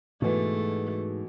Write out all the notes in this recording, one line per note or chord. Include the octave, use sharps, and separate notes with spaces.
G#2 B2 E3 A3